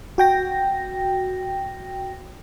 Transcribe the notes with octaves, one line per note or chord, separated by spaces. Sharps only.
F#4 G5 A#6